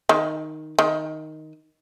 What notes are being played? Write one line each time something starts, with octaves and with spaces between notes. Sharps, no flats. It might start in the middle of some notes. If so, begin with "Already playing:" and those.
D#3
D#3